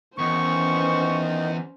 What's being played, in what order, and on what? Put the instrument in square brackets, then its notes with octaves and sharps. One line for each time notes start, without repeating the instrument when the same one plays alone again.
[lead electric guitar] E2 [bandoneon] D#3 D#4 [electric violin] C#4 C5 [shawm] C#6